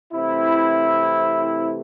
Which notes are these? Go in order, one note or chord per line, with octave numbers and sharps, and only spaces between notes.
C3 E3 A3 C4 E4